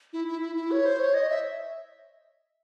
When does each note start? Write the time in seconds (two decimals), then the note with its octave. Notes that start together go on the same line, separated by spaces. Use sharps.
0.13 E4
0.28 E4
0.41 E4
0.56 E4
0.71 C#5
0.85 C5
1.00 C#5
1.14 D#5
1.30 E5